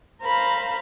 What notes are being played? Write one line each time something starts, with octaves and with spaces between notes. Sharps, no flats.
A#4 C5 F5 B5